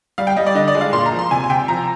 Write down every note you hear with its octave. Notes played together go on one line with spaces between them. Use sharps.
G3 F5
G5
G3 D#5
D5
D3 D#5
D5
G#3
F5
A#2 C6
A#5
F3
C6
C3 G#5
G#5
C3 G5
F3 A#5